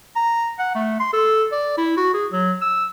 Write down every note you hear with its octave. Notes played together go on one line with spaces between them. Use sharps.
A#5
F#5
A3
C6
A4
D5
E4
F#4
G#4
F#3
E6